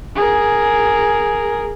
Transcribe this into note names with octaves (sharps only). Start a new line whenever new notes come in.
G#4 A#4